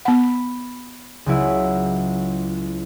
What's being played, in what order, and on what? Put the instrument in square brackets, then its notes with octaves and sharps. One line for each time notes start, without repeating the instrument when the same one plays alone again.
[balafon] B3 F#5 [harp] B5
[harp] C#2 F#3 E4